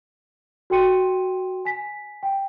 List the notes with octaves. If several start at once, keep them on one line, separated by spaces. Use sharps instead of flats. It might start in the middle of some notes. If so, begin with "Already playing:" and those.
F#4 A4 G5 C6 C#7 D#7
G#5 B6
G5